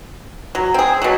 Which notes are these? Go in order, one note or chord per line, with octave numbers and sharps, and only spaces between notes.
F#3
C4 G#4
B2 F#3